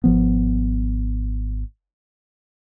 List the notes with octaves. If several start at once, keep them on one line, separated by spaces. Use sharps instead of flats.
G#1 F3 B3